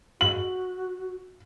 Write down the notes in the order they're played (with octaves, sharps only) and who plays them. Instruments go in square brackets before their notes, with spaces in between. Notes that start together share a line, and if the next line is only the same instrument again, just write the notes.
[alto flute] F#4 [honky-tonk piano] F#7